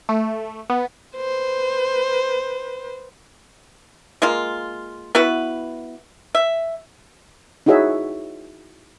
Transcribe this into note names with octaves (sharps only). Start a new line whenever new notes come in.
A3
B3
B4 C5
G#3 A#3 F4
B3 E4 F#4 B4
E5
D#4 E4 F#4 G#4 C#5 E5